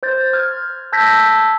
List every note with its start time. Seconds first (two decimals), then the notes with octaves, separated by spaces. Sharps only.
0.03 C5 G6 A6
0.33 F6 G#6
0.92 A5 E6 G6 G#6 A#6 B6